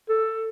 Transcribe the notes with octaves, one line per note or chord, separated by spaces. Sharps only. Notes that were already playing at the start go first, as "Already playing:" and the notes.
A4